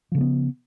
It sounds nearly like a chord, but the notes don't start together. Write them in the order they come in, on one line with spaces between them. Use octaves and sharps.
F3 C#3 G#3 B3